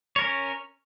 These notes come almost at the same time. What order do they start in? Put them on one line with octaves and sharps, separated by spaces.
C#5 A#4 C#4